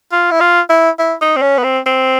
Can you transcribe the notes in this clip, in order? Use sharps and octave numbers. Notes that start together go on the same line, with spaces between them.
F4
E4
F4
E4
E4
D#4
C4
C#4
B3
C4
C4